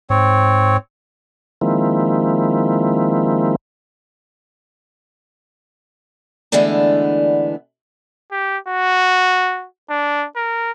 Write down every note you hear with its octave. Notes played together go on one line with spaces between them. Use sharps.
G#2 C4 C#5
D#3 F3 G#3 A#3 C4 E4
D3 E3 G#3 A3 B3 D4
G4
F#4
D4
A#4